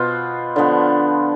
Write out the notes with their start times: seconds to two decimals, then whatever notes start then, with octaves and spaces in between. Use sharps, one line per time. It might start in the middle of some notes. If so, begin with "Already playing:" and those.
Already playing: B2 B3 F4 C5
0.56 D3 F3 B3